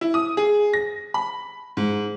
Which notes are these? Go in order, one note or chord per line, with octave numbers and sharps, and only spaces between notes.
E4
D#6
G#4
A#6
B5
G#2